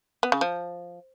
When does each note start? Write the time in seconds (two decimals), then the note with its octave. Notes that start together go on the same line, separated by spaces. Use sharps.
0.23 B3
0.32 C#3
0.41 F3